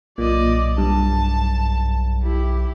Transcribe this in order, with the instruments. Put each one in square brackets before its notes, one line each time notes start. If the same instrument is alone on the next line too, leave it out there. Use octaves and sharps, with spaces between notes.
[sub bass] B1 [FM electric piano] A#2 [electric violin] D5 D#5
[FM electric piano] G2 [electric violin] A5
[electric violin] E4 G4